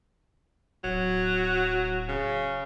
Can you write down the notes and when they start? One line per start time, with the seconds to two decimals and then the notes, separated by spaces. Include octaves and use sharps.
0.84 D1 F#3
2.08 C#3